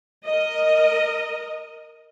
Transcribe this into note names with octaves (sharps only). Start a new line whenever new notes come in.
A#4 D#5